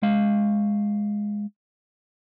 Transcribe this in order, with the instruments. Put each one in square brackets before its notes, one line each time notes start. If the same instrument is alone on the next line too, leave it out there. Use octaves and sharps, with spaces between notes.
[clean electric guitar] G#3 F5